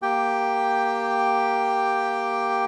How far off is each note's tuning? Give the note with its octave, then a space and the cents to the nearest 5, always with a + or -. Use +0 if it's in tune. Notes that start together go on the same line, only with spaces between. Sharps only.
A#3 +0 G4 +0 G5 +5